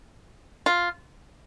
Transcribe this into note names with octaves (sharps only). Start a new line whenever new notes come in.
F4